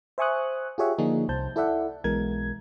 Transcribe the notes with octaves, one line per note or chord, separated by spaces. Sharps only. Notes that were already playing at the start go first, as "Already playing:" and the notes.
C5 E5 G#5 C#6 D#6 F#6
F4 G4 G#4 C#5 E5 F#5
D3 F3 A#3 D4 D#4 G#4
C2 C5 A5 G6
E4 A4 D5 E5 F#5
B1 B2 E3 G#3 A#4 G#6